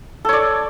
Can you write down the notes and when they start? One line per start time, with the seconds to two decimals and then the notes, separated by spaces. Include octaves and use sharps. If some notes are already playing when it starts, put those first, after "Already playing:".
0.25 A4
0.29 C#5
0.33 D5